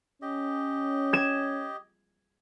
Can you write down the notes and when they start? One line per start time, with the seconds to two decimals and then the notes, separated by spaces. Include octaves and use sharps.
0.22 C#4 G4 D#5
1.13 G#6 E7